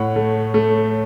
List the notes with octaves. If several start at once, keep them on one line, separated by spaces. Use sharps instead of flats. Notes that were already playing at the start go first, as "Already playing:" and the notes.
Already playing: A2 C#5 F#5
A3
A3